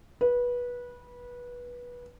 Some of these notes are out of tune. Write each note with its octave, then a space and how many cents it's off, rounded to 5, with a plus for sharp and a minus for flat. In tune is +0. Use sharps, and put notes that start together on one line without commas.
B4 -20